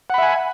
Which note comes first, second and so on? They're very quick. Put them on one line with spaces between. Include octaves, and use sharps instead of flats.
F#5 B5 E5 G#5